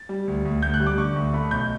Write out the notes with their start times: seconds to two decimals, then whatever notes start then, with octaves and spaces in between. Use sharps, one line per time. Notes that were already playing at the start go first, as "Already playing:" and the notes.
Already playing: A6
0.09 G3
0.28 D2
0.45 D2
0.62 D2 G6
0.74 F#6
0.80 G3
0.87 D6
0.98 D3 C#6
1.16 D2
1.33 A3 B5
1.51 B1 G6